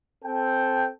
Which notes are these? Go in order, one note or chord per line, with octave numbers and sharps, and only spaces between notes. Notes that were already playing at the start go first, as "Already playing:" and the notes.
C4 A4 G5